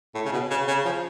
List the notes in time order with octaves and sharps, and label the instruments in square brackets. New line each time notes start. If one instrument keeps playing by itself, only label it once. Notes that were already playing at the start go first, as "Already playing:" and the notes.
[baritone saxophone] A2
C#3
B2
C#3
C#3
F3